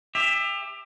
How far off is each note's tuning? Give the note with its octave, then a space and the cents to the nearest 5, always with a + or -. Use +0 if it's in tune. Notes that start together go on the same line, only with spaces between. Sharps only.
G4 +35 E5 +0